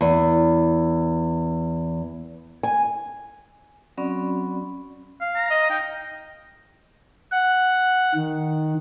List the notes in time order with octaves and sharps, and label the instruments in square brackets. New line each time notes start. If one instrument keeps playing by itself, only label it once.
[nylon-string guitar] E2
G#5
[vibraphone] F#3 C4 C#4 F#4 D5 B5
[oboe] F5
[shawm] A#5
[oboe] D#5
[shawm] D#4 [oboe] G5
[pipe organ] F#5
D#3